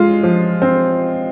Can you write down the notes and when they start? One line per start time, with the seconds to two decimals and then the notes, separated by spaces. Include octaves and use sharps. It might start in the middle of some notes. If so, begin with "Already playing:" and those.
Already playing: G#3 F4
0.23 F3
0.62 C4